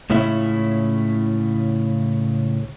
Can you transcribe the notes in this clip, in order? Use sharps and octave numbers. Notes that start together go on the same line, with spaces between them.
C#2 A2 C#3 C#4 E4 E5